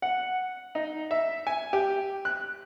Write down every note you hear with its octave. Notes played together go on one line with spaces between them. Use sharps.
F#5
D#4
E5
G#5
G4
F#6